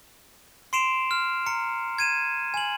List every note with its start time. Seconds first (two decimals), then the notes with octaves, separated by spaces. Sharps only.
0.73 C6 C7 D7 E7 F7
1.11 F6
1.46 A#5 C#7
1.98 G#6 D#7 E7
2.54 G#5 F#7